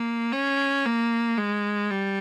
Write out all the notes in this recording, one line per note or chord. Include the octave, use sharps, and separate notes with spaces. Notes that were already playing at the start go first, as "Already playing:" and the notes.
Already playing: A#3
C#4
A#3
G#3
G3